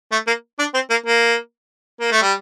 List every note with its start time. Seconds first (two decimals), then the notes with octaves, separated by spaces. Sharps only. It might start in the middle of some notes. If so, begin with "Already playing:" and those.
0.12 A3
0.27 A#3
0.59 D4
0.74 C4
0.90 A#3
1.06 A#3
2.00 A#3
2.12 A3
2.22 G3